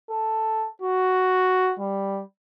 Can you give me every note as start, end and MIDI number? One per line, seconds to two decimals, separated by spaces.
0.11 0.68 69
0.82 1.74 66
1.80 2.22 55